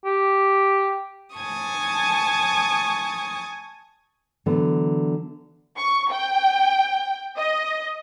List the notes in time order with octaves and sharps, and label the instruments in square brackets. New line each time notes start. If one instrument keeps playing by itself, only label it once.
[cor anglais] G4
[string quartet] G#5 A5 C#6 D#6
[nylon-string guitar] D3 E3 F#3 B3
[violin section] C#6
G5
D#5